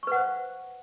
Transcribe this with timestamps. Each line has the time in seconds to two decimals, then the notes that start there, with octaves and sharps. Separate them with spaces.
0.03 C#6
0.07 B4
0.12 F#5
0.16 C5
0.20 F5